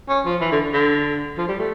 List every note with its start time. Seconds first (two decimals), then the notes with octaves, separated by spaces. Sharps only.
0.09 C#4
0.25 F3
0.41 E3
0.52 D3
0.73 D3
1.38 F3
1.48 G3
1.59 A3